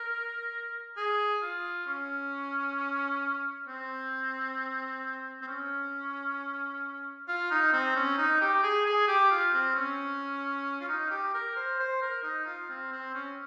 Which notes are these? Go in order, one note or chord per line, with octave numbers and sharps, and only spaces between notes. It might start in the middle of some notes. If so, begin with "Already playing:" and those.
Already playing: A#4
G#4
F4
C#4
C4
C4
C#4
F4
D#4
C4
C#4
D#4
G4
G#4
G#4
G4
F4
C4
C#4
F4
D#4
G4
A#4
C5
C5
A#4
D#4
F4
C4
C4
C#4